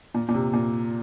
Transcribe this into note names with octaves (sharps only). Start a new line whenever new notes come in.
A#2
A#2
C3
A#2